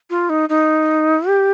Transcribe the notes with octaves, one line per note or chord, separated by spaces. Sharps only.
F4
D#4
D#4
G4